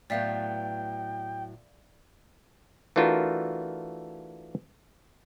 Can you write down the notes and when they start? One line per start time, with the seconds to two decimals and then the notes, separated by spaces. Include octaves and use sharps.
0.10 A2 F#3 B3 D5 E5 F5 G5
2.96 E3 A3 D4 F4 F#4 A#4